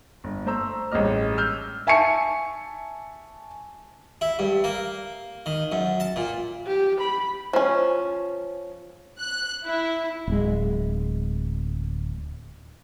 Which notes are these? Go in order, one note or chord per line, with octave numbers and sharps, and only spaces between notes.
G1
A3 C5 A#5 E6
A1 G2 G#3 D#5 F6
E6 F6 G6
E5 G#5 A5 C#6 C#7
E4
G2
A#3
D#3
F#2
A5
A#2
G4
B5
F3 C#4
F#6
E4
D1 G#3